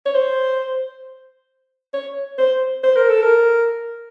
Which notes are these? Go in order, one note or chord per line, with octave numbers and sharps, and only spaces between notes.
C#5
C5
C#5
C5
C5
A#4
A4
A#4